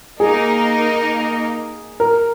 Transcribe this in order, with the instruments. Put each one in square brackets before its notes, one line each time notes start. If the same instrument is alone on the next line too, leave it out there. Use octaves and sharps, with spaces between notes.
[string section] A#3 D#4 A#4 [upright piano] G#4
[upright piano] A#4